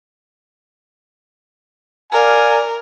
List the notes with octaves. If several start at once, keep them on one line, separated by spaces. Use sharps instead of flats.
A#4 D5 F5 G#5